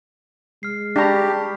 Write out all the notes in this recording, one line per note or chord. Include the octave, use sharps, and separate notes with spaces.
G#3 F6 C7
D4 G4 A#5 B5 C#6 B6